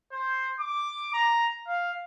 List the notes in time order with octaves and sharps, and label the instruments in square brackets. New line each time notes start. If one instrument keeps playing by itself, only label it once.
[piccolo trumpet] C5
D6
A#5
F5